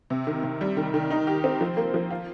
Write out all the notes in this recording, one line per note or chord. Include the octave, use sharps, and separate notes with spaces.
C3
D#3
C3
G3
D#3
D#3
D#4
G4
C4
F3
A#3
F3
F4